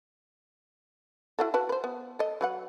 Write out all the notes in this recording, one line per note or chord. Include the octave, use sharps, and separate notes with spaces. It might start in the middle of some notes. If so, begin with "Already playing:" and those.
E4 F#4 A4
F#4 B4 A5
B4 C5
B3
A4 D#5
F#3 B4 F#5